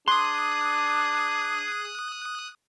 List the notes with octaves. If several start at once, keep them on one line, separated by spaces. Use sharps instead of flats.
D4 G#4 C6 D#6 F#6